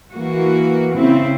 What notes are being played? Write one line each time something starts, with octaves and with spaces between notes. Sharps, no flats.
E3 A#3 F#4
C#3 C4 E4